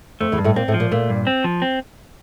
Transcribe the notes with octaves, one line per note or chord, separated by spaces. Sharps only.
F2 A3
E2 E3
G2
A2 A3
A#2 A#3 C4
A2 A3
F3
A#2 A#3
A#2 A3 A#3
G2
C4
F3
C4